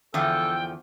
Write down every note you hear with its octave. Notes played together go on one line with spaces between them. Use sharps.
E2 D3 F3 A4 G5